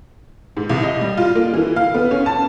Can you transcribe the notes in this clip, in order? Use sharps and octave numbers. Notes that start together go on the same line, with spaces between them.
G#2
C2
D#5
G3
F4
A#3
E3
F5
B3
C#4
A5